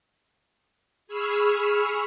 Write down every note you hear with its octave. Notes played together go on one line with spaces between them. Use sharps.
G#4 B5 C#6 E6 F6